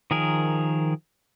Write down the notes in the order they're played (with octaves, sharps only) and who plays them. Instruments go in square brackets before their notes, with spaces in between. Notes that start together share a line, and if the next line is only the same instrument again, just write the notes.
[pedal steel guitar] D#3 F3 G#4 A#4